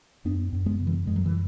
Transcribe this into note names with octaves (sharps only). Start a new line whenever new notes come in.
F#2 B3 D4
F#2
G#3 B3
C#3
E3
F#2 G#3
F#3
E3